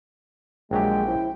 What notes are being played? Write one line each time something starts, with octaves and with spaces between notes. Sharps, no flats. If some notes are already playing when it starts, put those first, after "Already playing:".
A#1 F#3 G#3 G4 G5
C#4 E4 C5